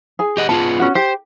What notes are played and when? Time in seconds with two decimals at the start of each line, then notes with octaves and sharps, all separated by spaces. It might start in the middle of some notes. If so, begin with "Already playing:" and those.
0.19 G#4 G#5
0.37 G4 D#5 F#5
0.49 B3 F4 G#4 A5
0.80 C#4 F#4
0.95 G4 C5